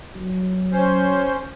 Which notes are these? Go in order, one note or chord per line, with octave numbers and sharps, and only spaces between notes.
F#3
C#4 C5